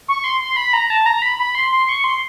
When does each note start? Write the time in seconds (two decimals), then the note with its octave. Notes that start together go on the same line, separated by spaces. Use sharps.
0.08 C#6
0.24 C6
0.40 C6
0.56 B5
0.73 A#5
0.90 A5
1.06 A#5
1.22 B5
1.39 B5
1.55 C6
1.72 C6
1.89 C#6
2.04 C6